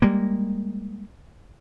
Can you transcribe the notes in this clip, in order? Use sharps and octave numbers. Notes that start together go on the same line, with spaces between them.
G3 G#3 A#3